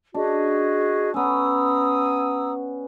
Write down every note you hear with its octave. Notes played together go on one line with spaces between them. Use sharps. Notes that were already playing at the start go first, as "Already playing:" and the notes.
D4 F#4 G#4 D#5
B3 C#4 A#5 D#6 E6